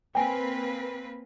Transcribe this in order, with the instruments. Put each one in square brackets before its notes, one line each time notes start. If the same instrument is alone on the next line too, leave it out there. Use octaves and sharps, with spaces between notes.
[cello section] A#3 C4 B4 [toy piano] G5 G#5